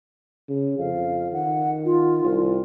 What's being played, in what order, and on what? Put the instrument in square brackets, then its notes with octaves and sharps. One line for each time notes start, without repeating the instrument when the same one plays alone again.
[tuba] C#3
[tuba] F2 [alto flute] F5
[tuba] D#3 [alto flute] F#5
[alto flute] F4
[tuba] C2